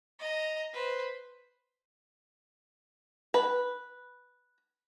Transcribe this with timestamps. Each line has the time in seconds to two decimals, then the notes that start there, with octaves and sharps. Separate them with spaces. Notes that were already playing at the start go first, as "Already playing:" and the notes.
0.19 D#5 A#5
0.73 B4 C5
3.34 B4